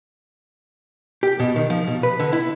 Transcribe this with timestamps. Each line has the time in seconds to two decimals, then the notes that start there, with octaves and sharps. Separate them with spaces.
1.23 G4
1.40 B2
1.56 D#3
1.70 F3
1.87 B2
2.03 B4
2.20 D3
2.33 E4